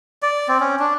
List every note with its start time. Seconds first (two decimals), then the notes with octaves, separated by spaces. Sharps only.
0.23 D5
0.48 C4
0.60 C#4
0.80 D4